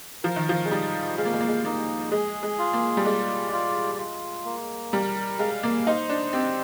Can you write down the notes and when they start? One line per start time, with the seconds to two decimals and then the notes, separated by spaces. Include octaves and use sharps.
0.23 F3 A#4
0.36 D#3
0.49 F3
0.65 G#3
0.71 G3 D#4
1.18 G#3 F5
1.25 A#3
1.33 G#3
1.40 A#3
1.48 G#3
1.65 A#3 D#4
2.11 G#3 G#4
2.43 G#3
2.59 F4
2.73 A#3
2.97 G3
3.05 G#3 D5
3.52 F4
3.98 F4
4.45 A#3
4.93 G3 A#4
5.39 G#3 F5
5.63 A#3
5.87 D#4 C5
6.09 D4
6.33 C4 G4